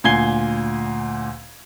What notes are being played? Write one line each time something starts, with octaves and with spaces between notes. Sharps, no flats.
D2 A#2 G#5 G#6 C7 G7